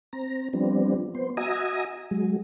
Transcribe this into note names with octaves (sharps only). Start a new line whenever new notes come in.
C4 A#5
F3 G3 B3 C4 D4
B3 C5
F#4 D#5 E5 G#5 A#5 D#6
F#3 G#3